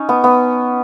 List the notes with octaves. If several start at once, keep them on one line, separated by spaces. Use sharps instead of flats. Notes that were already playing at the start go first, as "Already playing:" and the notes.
Already playing: C#4 D#4
B3
B3